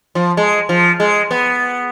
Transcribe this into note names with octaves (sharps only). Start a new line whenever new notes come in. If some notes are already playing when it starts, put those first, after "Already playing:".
F3
G#3
F3
G#3
B3